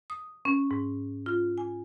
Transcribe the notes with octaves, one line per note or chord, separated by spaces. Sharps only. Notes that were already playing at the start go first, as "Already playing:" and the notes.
D#6
C#4
G#2
F4
G#5